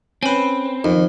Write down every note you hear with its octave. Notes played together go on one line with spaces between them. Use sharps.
C4 C#4 B4 G#5 B5
F2 D#3